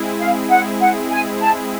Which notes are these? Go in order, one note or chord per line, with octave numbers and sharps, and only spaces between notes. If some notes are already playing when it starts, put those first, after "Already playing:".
Already playing: G#3 C4 E4 G#4
F5
F#5
F#5
G#5
A5